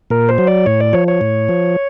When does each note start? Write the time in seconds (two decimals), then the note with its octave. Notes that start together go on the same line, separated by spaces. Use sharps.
0.10 A#2 A#4
0.29 C5
0.38 F#3
0.47 D5
0.66 A2 C#5
0.80 D5
0.93 F3 C#5
1.08 C#5
1.21 A2
1.49 F3